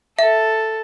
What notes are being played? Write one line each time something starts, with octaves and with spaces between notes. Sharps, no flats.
A4 E5